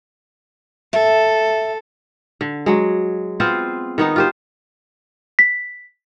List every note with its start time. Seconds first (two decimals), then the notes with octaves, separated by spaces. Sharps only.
0.93 A4 E5
2.41 D3
2.66 F#3 G#3
3.40 B3 C4 F4 C5
3.98 D#3 B3 D#4
4.16 F4 G4 C5
5.39 B6